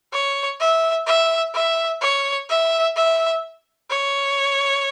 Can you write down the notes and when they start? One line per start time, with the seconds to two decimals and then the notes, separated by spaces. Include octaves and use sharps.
0.13 C#5
0.61 E5
1.07 E5
1.54 E5
2.01 C#5
2.49 E5
2.96 E5
3.90 C#5